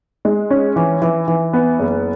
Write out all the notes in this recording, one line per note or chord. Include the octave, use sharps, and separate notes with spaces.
G#3
C#4
E3
E3
E3
B3
F#1